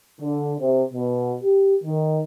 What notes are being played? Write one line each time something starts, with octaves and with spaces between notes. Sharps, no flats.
D3
C3
B2
G4
D#3